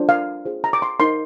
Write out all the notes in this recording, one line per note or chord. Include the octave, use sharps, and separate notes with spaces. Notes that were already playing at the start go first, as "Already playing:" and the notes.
Already playing: D4 F4 C5
F5
F4 G#4 C5
A#5
D6
C6
D#4 A#4 C6